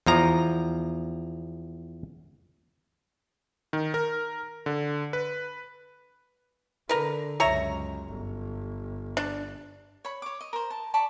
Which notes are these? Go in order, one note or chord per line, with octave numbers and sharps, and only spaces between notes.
E2 F3 A#5
D#3
A#4
D3
B4
D3 A#4 B4
C#2 F#2 C#5 E5 A#5
G1
D4
C#5 B5
C#5 D6
D#5
A#4 C5
A5
D5 A5 B5 C#6